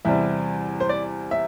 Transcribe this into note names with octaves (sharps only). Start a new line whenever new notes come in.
E2 C3 G3 E5
C5
D5
E5